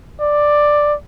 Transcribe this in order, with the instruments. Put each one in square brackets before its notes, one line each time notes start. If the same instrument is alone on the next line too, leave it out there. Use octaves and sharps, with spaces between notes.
[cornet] D5